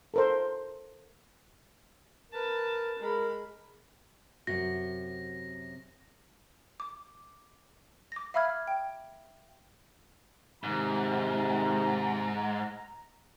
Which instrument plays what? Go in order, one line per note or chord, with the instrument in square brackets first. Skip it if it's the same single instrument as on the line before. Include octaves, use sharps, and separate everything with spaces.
[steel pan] A4 A#4 C5
[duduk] A#4 [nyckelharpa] B4 A5
[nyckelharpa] G#3 B5 [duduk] A#4
[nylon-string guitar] F#2 C3 F#4 [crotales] A#6
[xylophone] D6
D6 A#6
E5 F5 B5 E6 F6 G#6
G5
[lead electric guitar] G#2 [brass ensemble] C3 D#3 [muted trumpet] A#5